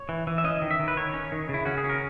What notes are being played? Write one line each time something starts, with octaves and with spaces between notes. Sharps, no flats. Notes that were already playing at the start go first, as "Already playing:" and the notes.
Already playing: C#5
E3
E3
E5
C#4 D#5
D#3
E5
D#3
B4
D#3 C#5
C#4
D#3
C#3 E4
C#4 F#4
G#4
C#4
A#4